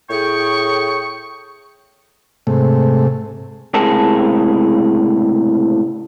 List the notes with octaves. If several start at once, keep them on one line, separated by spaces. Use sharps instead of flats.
A2 G#4 G5 C#6
G#2 C3 A3
C#2 A2 C3 G#4 A#4 A5